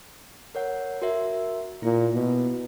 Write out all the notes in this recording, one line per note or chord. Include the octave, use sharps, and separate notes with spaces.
A#4 C#5 F#5
F#4 A#4 E5
A#2 E4
B2